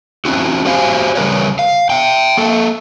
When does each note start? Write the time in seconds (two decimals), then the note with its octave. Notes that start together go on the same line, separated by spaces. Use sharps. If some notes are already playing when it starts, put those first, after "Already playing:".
0.25 C4 C#4 E4 F#4
0.65 F#4 G4 C5 F5 F#5 G#5
1.15 C#3 E3 G3 A#4 B4 C#5
1.59 F5
1.90 E5 G5
2.37 A#3 A4